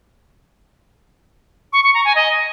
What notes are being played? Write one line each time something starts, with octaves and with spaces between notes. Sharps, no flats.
C#6
C#6
A#5
G#5
D#5